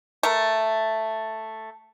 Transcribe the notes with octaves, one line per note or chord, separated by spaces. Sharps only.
A3 A#4